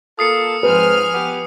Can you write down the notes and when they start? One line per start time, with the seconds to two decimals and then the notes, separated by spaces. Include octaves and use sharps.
0.19 A#3 F4 A4 D#6 C7 C#7
0.63 G#2 F3 C4 B4 G#5 F6
1.14 B3 G4